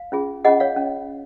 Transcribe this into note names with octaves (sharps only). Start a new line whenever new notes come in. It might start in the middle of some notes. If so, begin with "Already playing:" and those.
Already playing: F5
C#4 F4 G#4
C#4 F4 G#4 D#5 F#5
C#5 F5
C#4